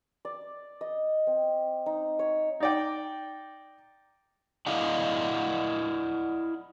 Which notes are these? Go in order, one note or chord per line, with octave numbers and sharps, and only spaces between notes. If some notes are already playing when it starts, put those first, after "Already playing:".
D5
D#5
C4
D#4
C#5
D#4 D5 G5
E4 D5 D#5 F5 F#5